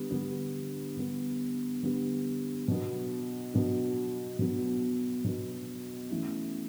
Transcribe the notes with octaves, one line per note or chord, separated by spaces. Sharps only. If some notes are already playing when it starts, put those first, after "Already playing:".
Already playing: D3 G3 B3
D3 G3 B3
D3 G3 B3
D3 G3 B3
B2 F#3 B3 D4
B2 F#3 B3 D4
B2 F#3 B3 D4
B2 F#3 B3 D4
E3 A3 C#4 E4